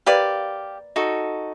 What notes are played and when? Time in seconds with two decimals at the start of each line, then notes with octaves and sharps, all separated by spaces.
0.06 A#3 G4 B4 D5 F5
0.96 D#4 F#4 A4